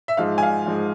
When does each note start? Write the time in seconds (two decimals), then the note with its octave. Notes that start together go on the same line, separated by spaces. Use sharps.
0.08 E5
0.17 G#2 F3 G#3 F5
0.38 G#5
0.43 F5
0.66 G#2 F3 G#3